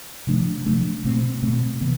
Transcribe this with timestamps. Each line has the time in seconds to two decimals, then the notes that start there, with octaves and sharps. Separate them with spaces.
0.27 C3 F3 A3 D4
0.66 C3 F3 A3 D4
1.05 B2 A3 C4
1.43 B2 A3 C4
1.81 C3 E3 B3